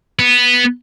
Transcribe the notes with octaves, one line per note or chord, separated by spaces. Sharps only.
B3